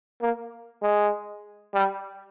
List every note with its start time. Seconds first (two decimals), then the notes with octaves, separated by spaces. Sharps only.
0.22 A#3
0.82 G#3
1.74 G3